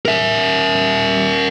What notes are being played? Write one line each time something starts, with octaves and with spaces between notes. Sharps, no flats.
A#4 E5